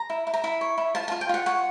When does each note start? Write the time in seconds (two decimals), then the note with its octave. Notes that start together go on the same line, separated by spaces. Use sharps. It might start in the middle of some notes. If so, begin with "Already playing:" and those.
Already playing: A#5
0.10 E4
0.27 E4
0.34 A#5
0.44 E4 B5
0.61 C#5
0.78 E4
0.95 F4 A5
1.08 F4 A5
1.21 G5
1.29 F4 F#5
1.46 C#5 F#5